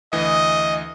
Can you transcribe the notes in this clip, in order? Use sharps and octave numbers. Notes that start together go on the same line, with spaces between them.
D2 E3 D#5 D#6